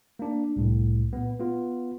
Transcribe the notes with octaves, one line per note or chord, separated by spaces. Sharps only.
A#3 D4
C2 A2
A#2 B3
B3 F4